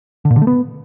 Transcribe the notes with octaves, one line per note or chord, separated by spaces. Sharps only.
D3
A#2
D3
A3
B3